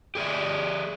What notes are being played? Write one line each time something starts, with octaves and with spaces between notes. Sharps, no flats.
G4 G#4 D5 E5